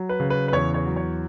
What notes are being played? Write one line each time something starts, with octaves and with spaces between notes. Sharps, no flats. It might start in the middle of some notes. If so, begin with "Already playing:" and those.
Already playing: F#3
B4
C#3
B4
B4
E2 C#5
C#5
F#3
C#5